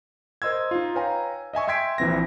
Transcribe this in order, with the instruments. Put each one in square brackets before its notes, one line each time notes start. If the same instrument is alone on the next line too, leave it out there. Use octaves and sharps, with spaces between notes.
[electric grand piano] A#4 C5 D#5 C6 E6 G#6
D#4 F4
B4 C#5 F5 G5 G#5 A#5
D#5 E5 G#5 C#6
E5 G5 C6 G#6 B6 D7
A#1 E3 C4 A#6